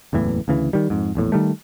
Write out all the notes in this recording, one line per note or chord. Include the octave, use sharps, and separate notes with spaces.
F#1 E2 A2 E3
D2 C#3 E3
D#3 G3
F2 G#2
A#1 E2 A2
D#3 G3 A3